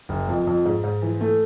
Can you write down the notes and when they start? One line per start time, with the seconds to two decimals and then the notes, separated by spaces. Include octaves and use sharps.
0.09 F#1
0.28 F2
0.47 F2
0.65 G#2
0.84 G#2
1.02 E3
1.21 A3